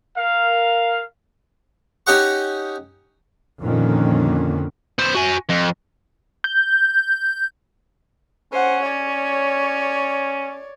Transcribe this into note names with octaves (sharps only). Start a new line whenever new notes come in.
A#4 F5
C#4 D#4 G4 D#5 F#5 C#6
F2 A#2 D3 D#3 A#3 C#4
B3 C5
F#4 G#5
F2
G6
C#4 C5 F#5
C#5 D5